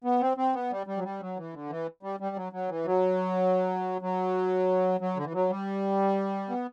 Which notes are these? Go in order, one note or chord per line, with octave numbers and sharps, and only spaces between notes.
B3
C4
C4
B3
G3
G3
F#3
G3
F#3
E3
D3
E3
G3
G3
F#3
F#3
E3
F#3
F#3
F#3
D3
E3
F#3
G3
B3